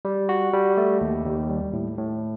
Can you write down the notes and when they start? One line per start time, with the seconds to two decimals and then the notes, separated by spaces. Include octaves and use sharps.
0.05 G3
0.29 F#4
0.53 G3
0.77 A3
1.01 D#2
1.25 D#2
1.49 G3
1.73 A2
1.98 A2